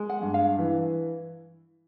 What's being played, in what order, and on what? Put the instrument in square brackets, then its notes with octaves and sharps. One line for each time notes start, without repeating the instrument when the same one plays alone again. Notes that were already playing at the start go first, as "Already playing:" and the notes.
Already playing: [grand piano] G#3
[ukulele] F#5
[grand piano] G2
[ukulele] F5
[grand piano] E3